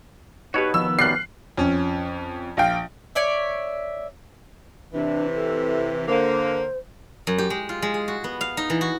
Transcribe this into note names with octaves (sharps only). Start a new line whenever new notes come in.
B2 D#4 F#4 G4 B4 C#5
D#3 F3 B3 E6
F#2 G3 F6 F#6 C7
F2 C#4
A#1 F5 G5
C#5 D5 E5
C3 E3 D4
A4
D3 A#3 C5
F#2
G4
G#3
F4
G#3
G#4
F#4
B3
F5
D#4
E3
F#4